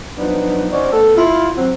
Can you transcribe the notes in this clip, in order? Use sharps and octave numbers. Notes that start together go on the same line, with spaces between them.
F3 F#3 B3 D4 D#4
C#4 D#4 F#4 C5 D5
A3 B3 A4
E4 F4
F#3 C4